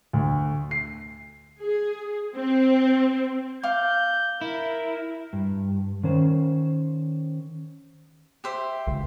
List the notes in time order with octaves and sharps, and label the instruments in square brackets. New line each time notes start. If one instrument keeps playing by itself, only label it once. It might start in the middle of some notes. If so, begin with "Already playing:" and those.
[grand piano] D2
C7
[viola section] G#4
C4
[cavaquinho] F5 D6 [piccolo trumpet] G6
[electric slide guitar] E4 [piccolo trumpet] A#4
[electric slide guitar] G2
D#3 C#4 C5
[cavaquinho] G4 C5 E5
[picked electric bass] C#2